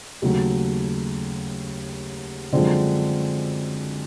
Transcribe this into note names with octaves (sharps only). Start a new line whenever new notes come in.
D#2 C#3 F#3 A3
F#2 D3 F3 G#3 C4